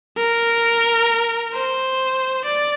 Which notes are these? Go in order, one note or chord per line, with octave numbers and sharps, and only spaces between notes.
A#4
C5
D5